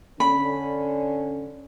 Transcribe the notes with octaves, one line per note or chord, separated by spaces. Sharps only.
D3 C#4 B5